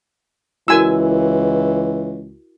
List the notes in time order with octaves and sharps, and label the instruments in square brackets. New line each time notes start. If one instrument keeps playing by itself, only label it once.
[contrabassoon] C#2 [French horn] E3 [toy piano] E4 F#4 A#4 [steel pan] G#5 E6